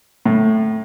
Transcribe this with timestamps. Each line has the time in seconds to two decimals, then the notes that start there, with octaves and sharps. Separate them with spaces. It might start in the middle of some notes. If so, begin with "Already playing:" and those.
0.26 A2